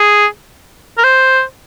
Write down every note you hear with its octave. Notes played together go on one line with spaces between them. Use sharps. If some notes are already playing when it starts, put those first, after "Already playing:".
Already playing: G#4
A#4
C5